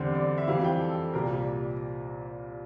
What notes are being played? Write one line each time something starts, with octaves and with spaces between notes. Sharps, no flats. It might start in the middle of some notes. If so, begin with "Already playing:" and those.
Already playing: E2 D3 G3 C4 C5
D5
E5
F2 E3 G3 C4 F5
G5
A4
C2 A#2 G3 A#3 A#4